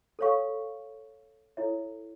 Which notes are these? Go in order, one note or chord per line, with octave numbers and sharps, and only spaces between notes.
A4 C#5 F5 C#6
E4 A4 C#5 E5